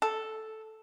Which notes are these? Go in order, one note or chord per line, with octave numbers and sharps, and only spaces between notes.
A4